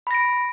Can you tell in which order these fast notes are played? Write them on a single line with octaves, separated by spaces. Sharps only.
B5 A#6 D7